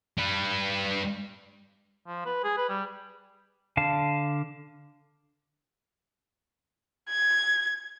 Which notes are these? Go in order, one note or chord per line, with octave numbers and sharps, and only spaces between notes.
G3 B4
F3
B4
G#4
B4
G3
D3 F5 A5
G#6